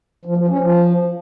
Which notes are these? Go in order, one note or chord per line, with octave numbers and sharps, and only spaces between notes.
F3
F3
C#4
F3